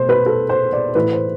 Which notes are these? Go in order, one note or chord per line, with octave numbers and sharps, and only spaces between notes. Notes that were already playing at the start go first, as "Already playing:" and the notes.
Already playing: B2 A3 C5
B4
A4
C5
D5
A2 E3 A3 B4
C5